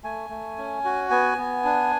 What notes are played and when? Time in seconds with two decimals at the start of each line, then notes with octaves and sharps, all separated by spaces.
0.04 A3 G#5
0.30 A3
0.58 C#4
0.85 F#4
1.11 B3 G#5
1.38 B3
1.64 D4